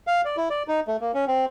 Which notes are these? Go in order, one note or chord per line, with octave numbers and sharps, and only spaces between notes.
F5
D5
E4
D5
D#4
A3
A#3
C#4
C4